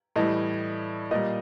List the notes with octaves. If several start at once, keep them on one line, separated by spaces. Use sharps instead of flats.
A2 E3 G3 D#5
A#2 G3 D#5